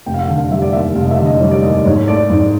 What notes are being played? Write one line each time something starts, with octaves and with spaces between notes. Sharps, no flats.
F1 G5
F5
F#5
D3
F5
G3 E5
D5
D#2 E5
F1 F5
D#5
E5
D3
D#5
G3 C#5
D5
D#2 D#5
D5
G#2 C#5
A3 D5
G#2 D5